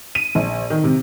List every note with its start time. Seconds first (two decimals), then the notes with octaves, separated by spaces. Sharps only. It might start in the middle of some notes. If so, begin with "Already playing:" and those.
0.15 D#7
0.35 A#1
0.70 D#3
0.84 C3